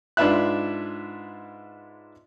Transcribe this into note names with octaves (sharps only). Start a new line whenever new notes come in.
G#2 D4 F4 B4 E5 F#6